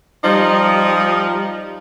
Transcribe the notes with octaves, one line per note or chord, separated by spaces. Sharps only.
F3 G3 D#4